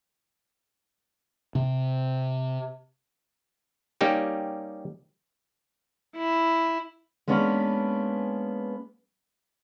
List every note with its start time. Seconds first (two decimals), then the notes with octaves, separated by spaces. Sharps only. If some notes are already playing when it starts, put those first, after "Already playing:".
1.55 C3 C4
4.01 G3 A#3 C#4 D#4 G4
6.17 E4
7.28 G#3 A#3 B3 C#4 D4 B4